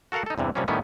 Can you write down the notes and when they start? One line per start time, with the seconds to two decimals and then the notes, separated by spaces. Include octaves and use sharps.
0.12 F#4 A4 A#4 F5 F#5
0.26 D#4 A4
0.38 E2 G2 C3 E3
0.55 C3 F3 G3 A#3 C4 C#4
0.68 A2 D#3 G3 B3 C#4 E4